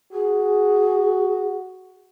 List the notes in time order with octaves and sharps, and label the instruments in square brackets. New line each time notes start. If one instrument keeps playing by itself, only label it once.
[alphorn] F#4 [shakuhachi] G#4